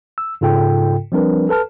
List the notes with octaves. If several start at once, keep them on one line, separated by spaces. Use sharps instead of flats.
E6
G#2 C#3 F4 A4 G5
F3 G3 C4 D4 A#4 B4
A4 B4 A5 F6